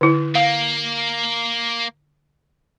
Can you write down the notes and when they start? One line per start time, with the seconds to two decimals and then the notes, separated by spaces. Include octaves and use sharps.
0.01 D3 E4
0.35 A#3 F5